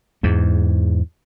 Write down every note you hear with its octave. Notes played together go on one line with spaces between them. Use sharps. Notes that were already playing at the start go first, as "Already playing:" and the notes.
E2 G#2